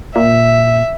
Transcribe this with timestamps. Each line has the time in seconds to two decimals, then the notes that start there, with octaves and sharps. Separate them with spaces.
0.16 A#2 E5